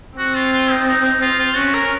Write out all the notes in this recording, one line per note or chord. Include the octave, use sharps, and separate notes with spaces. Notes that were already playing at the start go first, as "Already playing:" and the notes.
C4 F#4
F4
F4
D#4
D#4
D#4
F4
F4
C#4 F#4
A#4